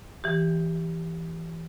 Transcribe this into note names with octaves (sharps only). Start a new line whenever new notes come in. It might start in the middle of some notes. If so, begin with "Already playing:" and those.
E3 G4